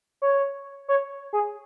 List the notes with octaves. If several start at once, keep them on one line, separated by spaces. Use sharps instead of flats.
C#5
C#5
G#4